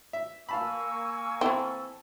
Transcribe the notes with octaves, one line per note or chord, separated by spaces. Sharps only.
E5
A#3 F5 G#5 A5 B5 C#6 E6
E3 C4 E4 A4